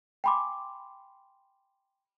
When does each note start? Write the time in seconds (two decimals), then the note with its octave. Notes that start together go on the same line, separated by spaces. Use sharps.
0.24 G5 G#5 B5 C6 D6